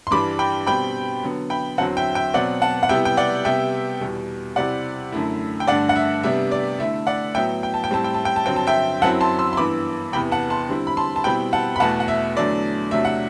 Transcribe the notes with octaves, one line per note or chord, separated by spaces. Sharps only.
C6
G2 E3 G3 D4 B5 D6
G5 B5
B2 G3 C4 G5 B5
D3 F#3 B3
G5 B5
E2 D3 F#3 C4 F#5 A5
E5 G5
E5 G5
B2 F#3 C4 D5 F#5
F#5 A5
F#5
C3 G3 B3 E4 E5 G5
G5
D5 F#5
C3 G3 B3 E5 G5
E2 B2 G3
C3 G3 C4 E4 D5 F#5
F#2 D3 A3 E4
G5
G2 D3 A3 D4 D5 F#5
F#5
E5
C3 G3 B3 D4 E5
D5
D3 A3 E4 E5
D5 F#5
A2 F#3 B3 E5 G5
G5
A5
G5
A2 G3 C4 E4 A5
G5
A5
G5
A5
G2 D3 F#3 C4 G5
A5
E5 G5
F#2 F#3 C4 E4 F#5 A5
A5 C6
C6 E6
C6
G2 E3 B3 E4 B5 D6
E2 C3 E3 B3 G5 B5
F#5 A5
A5 C6
D3 G3 C4 E4
B5
A5 C6
A5
B2 G3 C4 E4 G5 B5
F#5 A5
B5
E2 B2 A3 F#5 A5
F#5
E5
E2 D3 F#3 A3 D4 D5
E2 C3 F#3 A3 D4 E5
F#5